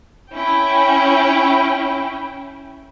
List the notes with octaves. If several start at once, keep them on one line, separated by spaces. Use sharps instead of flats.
C#4 E4 G5